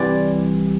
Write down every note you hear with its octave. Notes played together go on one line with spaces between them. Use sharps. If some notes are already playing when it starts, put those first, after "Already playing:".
Already playing: C2 C3 E3 D5